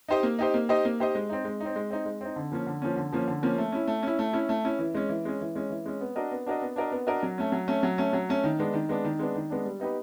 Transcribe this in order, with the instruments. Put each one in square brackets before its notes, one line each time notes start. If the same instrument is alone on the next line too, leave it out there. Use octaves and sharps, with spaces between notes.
[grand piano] D#4 G4 C5 D#5
A#3
D#4 G4 C5 D#5
A#3
D#4 G4 C5 D#5
A#3
D#4 G4 C5 D#5
G#3
C4 D#4
G#3
C4 D#4
G#3
C4 D#4
G#3
C4 D#4
D3
F3 A#3 C#4
D3
F3 A#3 C#4
D3
F3 A#3 C#4
D3
F3 A#3 C#4
A3
C#4 E4
A3
C#4 E4
A3
C#4 E4
A3
C#4 E4
E3
G#3 C#4
E3
G#3 C#4
E3
G#3 C#4
E3
G#3 C#4
B3
D4 F#4 A#4 D#5
B3
D4 F#4 A#4 D#5
B3
D4 F#4 A#4 D#5
B3
D4 F#4 A#4 D#5
F#3
A3 C#4
F#3
A3 C#4
F#3
A3 C#4
F#3
A3 C#4
D#3
G#3 B3 D4
D#3
G#3 B3 D4
D#3
G#3 B3 D4
D#3
G#3 B3 D4
G3
B3 D#4 G4 B4